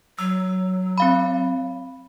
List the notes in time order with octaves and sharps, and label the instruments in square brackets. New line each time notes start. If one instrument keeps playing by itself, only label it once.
[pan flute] F#3 [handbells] E6
[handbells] C4 F5 B5